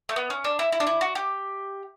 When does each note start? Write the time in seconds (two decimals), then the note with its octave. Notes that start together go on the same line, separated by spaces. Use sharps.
0.09 A3
0.16 B3
0.30 C#4
0.44 D4
0.59 E4
0.72 E4
0.80 D4
0.87 E4
1.01 F#4
1.15 G4